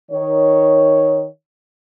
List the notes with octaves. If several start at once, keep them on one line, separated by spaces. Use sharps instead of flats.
D#3 C#5